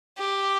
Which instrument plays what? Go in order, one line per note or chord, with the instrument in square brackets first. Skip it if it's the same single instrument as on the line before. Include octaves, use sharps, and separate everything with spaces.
[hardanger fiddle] G4